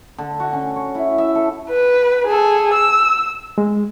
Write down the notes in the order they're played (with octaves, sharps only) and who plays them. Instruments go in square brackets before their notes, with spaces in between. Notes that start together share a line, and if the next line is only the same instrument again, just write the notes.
[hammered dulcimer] D3
F#4
C#4
C#5
E4
E5
A4
[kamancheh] B4
G#4 A4
E6
[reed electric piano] G#3